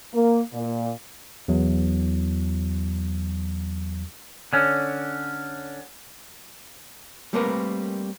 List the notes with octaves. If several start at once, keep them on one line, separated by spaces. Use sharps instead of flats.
A#3
A#2
E2 F#3
D3 C#4
G3 A3 A#3 C4 A#4 B4